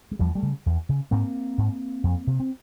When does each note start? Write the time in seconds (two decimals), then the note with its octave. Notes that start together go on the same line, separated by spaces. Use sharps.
0.11 G#3
0.19 E2 F3 G3
0.35 G3 A3
0.43 C#3
0.66 E2
0.89 C#3
1.11 G#2 A#3 C4
1.58 G#2
2.04 F2
2.27 C3
2.40 C4